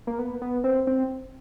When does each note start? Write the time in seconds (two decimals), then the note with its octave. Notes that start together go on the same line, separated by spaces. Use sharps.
0.07 A#3
0.19 B3
0.42 B3
0.64 C4
0.87 C4